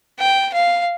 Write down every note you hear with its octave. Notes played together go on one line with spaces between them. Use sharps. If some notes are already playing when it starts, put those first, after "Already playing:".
G5
F5